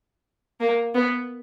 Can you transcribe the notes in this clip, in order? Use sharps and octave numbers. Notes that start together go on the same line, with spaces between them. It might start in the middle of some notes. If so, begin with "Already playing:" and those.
A#3
B3